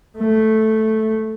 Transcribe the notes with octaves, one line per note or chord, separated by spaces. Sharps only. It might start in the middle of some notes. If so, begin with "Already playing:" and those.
A3